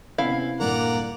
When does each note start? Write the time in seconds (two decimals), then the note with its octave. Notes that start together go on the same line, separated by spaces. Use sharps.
0.18 C3 B3 C#4 E4 F5
0.60 D#1 G2 A#3 D5 F#5 A#5